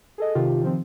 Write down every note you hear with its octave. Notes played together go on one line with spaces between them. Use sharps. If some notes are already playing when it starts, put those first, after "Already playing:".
G#4 A4 D#5
C3 D#3 F4 G4
D#3 F3 C4